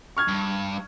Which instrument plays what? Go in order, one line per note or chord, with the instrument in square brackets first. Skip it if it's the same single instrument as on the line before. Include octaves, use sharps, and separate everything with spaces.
[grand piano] C#6 F6 G#6
[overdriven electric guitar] G2